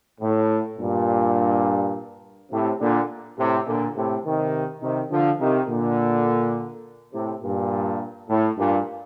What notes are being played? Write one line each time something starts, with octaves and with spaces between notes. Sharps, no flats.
A2
G2 A#2
A2 C3
A#2 D3
A2 C3
A#2 D3
A2 C3
C3 D#3
C3 D#3
D3 F3
C3 D#3
A#2 D3
A2 C3
G2 A#2
A2
G2 A#2